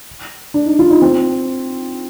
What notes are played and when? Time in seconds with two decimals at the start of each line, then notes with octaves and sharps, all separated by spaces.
0.54 D4
0.66 D#4
0.79 F4
0.90 D#4
1.02 C4